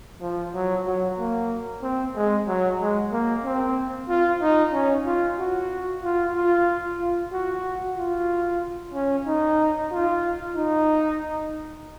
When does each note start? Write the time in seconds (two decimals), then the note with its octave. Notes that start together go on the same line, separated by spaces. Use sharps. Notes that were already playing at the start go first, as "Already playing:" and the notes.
0.21 F3
0.54 F#3
0.86 F#3
1.18 A#3
1.83 C4
2.16 G#3
2.47 F#3
2.80 G#3
3.12 A#3
3.44 C4
4.09 F4
4.41 D#4
4.73 C#4
5.06 F4
5.39 F#4
6.03 F4
6.36 F4
7.00 F4
7.32 F#4
7.97 F4
8.94 C#4
9.26 D#4
9.91 F4
10.56 D#4